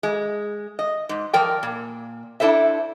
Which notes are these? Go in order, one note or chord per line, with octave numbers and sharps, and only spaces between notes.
G#3
D#5
G#2
F3 A#4 D5 G5
A#2
D4 E4 A4 C5 E5